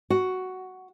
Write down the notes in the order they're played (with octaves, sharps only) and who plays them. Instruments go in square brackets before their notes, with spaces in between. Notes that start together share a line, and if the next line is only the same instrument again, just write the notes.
[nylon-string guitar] F#4